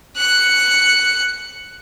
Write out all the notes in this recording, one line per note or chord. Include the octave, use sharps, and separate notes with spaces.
F#6 C#7